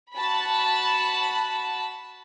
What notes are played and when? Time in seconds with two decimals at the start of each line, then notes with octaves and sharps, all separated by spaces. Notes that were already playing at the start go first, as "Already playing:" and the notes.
0.16 F#4 A5 B5